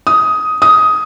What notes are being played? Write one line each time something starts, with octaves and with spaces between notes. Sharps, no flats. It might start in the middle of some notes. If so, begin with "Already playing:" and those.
D#6
D#6